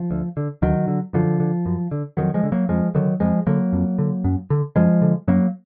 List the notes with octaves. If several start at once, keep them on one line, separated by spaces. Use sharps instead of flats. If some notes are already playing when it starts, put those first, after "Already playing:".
Already playing: F3
D2
D3
D2 D#3 F#3
D3
F#2 D3 F3
D3
F#2
D3
F2 D#3 F#3
F3 G#3
D3
F#3 A#3
F2 F3 G#3
D3 D#3 F#3
F2 F3 G#3
D3 F#3 A#3
F2
D3
F#2
D3
F#2 F3 G#3
D3
F#2 F#3 A#3